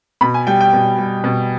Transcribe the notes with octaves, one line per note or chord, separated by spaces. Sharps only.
B2 B5
G#5
G3 G5
G5
B2
G3
B2